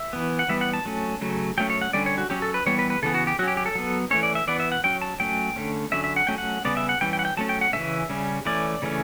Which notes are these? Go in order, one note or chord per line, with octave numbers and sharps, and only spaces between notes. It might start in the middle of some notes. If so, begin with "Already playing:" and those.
Already playing: E5
E3 B3
F#5
E3 G3 B3 E5
F#5
A5
F#3 A3 C#4
C#3 F#3 A3
F#3 A3 C#4 G5
C#5
F#5
D3 G3 C#4 D5
C#5
F#4
F#3 C#4 G4
A4
B4
E3 G3 B3 C#5
B4
B4
C#3 E3 B3 A4
F#4
G4
F#3 C#4 F#4 G4
G4
A4
F#3 B3
E3 A3 C#4 C#5
D5
E5
E3 B3 D5
E5
F#5
F#3 C#4 G5
A5
F#3 A3 C#4 G5
D3 A3 C#4
D3 F#3 C#4 E5
E5
F#5
F#3 A3 C#4 G5
F#5
C#3 G3 B3 D5
E5
F#5
E3 G3 C#4 G5
G5
F#5
G5
F#3 A3 C#4 A5
G5
F#5
C#3 E3 A3 C#4 E5
C#3 G3 C#4
E3 A3 C#4 D5
C#3 E3 A3 C#4